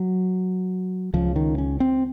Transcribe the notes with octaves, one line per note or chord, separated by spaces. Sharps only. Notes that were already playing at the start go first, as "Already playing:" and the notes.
Already playing: F#3
C#2 C#3 F3
D#3
C#4
C4